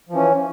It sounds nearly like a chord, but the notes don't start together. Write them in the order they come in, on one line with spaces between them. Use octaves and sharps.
F3 E3 C#4